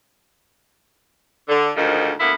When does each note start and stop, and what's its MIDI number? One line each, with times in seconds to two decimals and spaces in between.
1.49 1.71 50
1.76 2.11 38
1.76 2.11 44
1.76 2.11 51
1.76 2.11 53
2.19 2.32 38
2.19 2.32 58
2.19 2.32 59
2.19 2.32 64